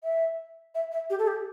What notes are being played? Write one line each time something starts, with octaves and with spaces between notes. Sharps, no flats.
E5
E5
E5
G4
A4
G4